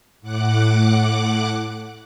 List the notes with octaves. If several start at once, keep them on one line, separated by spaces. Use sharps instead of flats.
A2 F#5 D6 F#6